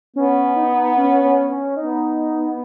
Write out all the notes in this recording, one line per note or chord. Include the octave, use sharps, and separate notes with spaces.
B3 C#4
D#4
C#4
C#4
C#4
B3 D#4